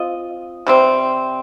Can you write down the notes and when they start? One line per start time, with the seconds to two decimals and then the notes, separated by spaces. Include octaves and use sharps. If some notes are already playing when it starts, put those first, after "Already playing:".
Already playing: C4 F4 D#5
0.67 C3 G3 C4